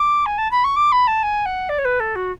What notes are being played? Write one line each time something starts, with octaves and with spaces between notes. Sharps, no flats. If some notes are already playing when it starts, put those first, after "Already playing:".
Already playing: D6
G#5
A5
B5
C#6
D6
B5
A5
G#5
F#5
D5
C#5
B4
A4
F#4